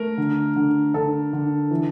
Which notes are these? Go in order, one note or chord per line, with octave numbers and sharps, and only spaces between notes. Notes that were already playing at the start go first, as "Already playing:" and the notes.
Already playing: A3 A#4
D3
D3
D3 A4
D3
E3